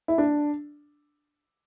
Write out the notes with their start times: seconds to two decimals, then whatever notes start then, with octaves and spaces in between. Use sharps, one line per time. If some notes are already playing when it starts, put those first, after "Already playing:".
0.08 E4
0.18 D4